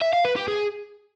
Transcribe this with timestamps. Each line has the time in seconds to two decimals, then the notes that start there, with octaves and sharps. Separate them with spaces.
0.01 E5
0.13 F5
0.25 B4
0.36 G4
0.48 G#4